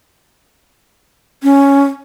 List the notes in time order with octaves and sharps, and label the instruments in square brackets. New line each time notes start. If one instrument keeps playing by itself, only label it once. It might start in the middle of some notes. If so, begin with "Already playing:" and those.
[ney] C#4